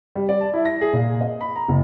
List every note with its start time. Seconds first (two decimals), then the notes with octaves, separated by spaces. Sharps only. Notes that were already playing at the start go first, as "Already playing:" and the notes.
0.15 G3
0.29 D5
0.41 A5
0.53 E4
0.65 A#6
0.81 G#4
0.93 A#2
1.21 D#5
1.41 B5
1.56 A#5
1.68 F#1